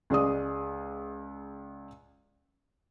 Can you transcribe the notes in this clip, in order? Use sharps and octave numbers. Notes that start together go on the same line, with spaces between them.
C#2 G#3 D5 D#6